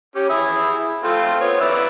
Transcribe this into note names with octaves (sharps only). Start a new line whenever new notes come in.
C#4 G4
E4 G#4 B5
A3 C4 F4
B3 C#5
B4 D5 E5